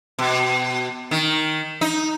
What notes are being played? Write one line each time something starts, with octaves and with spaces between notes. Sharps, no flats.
B2
D#3
D#4